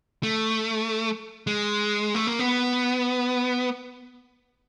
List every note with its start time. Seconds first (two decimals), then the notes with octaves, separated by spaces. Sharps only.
0.23 A3
1.47 G#3
2.15 A3
2.27 A#3
2.39 B3